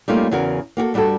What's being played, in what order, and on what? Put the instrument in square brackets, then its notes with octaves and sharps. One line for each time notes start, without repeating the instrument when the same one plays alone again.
[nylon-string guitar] G3 A3 A#3 C#4 D#4 F4
E2 C#3 F#4 A#4
A#3 F#4 G4 A4
G2 G3 D4 F#4 A4